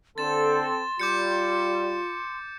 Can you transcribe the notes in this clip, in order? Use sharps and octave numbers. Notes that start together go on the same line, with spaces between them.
D3 C4 A4 C6 A6 E7
G3 F4 D6 G6 C#7